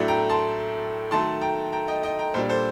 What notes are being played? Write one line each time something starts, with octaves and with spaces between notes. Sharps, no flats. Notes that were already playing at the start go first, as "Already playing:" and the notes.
Already playing: A2 F#3 A3 D4
G5 A#5
A5 C6
D#3 F#3 A3 A5 C6
G5 A#5
G5 A#5
D#5 G5
D#5 G5
G5 A#5
A#2 G3 D4 A4 C5
A4 C5